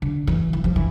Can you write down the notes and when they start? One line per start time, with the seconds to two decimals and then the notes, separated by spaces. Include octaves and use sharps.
0.02 D3
0.27 E3
0.53 E3
0.64 F3
0.76 E3